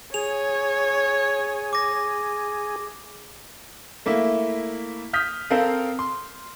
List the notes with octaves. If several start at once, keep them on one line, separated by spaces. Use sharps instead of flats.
G#4 C#5 F7
D6 A#6
A3 A#3 E4 E5
D#6 F6 G6 B6
C4 A4 A#4 F5
C6